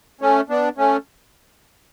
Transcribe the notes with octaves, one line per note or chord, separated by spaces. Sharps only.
A3 C#4
B3 D4
A3 C#4